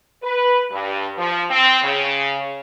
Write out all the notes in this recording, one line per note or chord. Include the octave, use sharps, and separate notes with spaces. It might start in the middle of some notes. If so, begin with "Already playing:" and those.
B4
G2
F3
C4
C#3